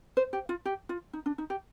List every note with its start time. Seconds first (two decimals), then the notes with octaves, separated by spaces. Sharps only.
0.17 C5
0.33 G4
0.49 F4
0.65 G4
0.89 F4
1.13 D#4
1.26 D4
1.38 D#4
1.50 G4